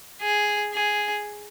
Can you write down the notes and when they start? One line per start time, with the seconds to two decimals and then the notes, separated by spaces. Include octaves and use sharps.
0.21 G#4
0.73 G#4